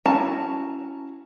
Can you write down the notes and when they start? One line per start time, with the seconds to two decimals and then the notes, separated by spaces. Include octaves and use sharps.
0.06 C#4 E4 F#4 A5 A#5